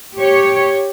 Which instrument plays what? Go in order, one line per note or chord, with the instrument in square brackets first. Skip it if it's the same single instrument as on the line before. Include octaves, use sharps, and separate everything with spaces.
[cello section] G4 C#5